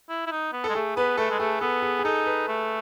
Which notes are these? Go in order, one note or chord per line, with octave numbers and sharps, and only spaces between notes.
E4
E4
D#4
B3
G#3 A4
A3 G#4
B3 B4
A3 A4
G#3
A3 G#4
B3 A4
G#4
G#4
D#4 A4
B4
A3